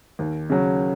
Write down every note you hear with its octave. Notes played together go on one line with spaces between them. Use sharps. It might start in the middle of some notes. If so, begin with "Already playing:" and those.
D#2
C#3 F#3